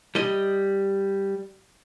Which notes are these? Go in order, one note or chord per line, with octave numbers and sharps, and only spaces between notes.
G3 D#5